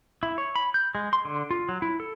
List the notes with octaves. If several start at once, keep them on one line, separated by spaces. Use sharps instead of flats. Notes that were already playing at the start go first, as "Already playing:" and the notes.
E4
C#5
B5
G6
G#3
C6
D3
F4
F#3
E4
A4